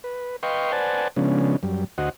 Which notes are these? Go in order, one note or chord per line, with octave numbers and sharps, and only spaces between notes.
B4
B4 D#5 F5 G5 C6 C#6
B4 C5 D5 F#5 G#5 A5
C#3 F3 G#3 B3 C#4 D4
F#2 G3
D2 F#4 C5 D#5 F#5